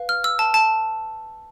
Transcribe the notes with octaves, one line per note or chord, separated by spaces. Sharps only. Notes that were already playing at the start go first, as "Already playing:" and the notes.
Already playing: B4 F5
F6
E6
A5
A5